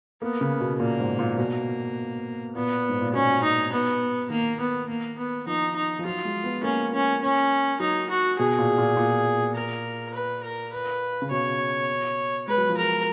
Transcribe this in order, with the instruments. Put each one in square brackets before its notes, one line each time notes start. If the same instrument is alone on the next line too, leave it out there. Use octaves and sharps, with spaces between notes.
[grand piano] A#3 [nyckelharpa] B3
[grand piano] C#3
B2
[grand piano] A#2 [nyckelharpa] A#3
[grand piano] G#2
A#2
[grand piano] B2 [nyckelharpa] A#3
[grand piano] A#2 [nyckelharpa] B3
[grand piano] G#2
A#2
[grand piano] B2 [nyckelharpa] C#4
[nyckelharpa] D#4
B3
[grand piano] D#3 [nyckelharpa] A#3
[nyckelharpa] B3
A#3
B3
[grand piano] F3 [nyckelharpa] D#4
[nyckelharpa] D#4
[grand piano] F3
[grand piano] F#3 [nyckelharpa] F4
[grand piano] G#3
B3
[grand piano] A#3 [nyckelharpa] C#4
[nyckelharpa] C#4
C#4
[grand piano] F#3 [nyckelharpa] D#4
[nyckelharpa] F#4
[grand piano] B2 [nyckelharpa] G#4
[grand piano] A#2
A#2
A#2
[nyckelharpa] A#4
B4
A#4
B4
[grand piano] C#3
[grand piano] B2 [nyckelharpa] C#5
[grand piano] G#3 [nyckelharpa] B4
[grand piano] F#3
F3
[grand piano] F#3 [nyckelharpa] A#4